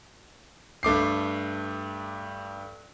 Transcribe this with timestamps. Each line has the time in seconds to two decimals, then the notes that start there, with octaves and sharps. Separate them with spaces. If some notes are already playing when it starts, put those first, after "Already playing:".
0.83 G2 A3 D6 C7